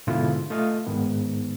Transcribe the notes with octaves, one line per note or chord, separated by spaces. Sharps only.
G#2 B2 D3 E4 F4
A3 F4 D#5 F5
G#2 D#3 B3